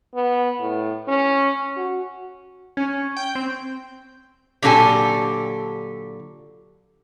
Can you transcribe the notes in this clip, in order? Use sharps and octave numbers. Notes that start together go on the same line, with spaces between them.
B3
A2
C#4
F#4
C#4
G5
C4
A#2 D3 F#3 G4 A4 G#5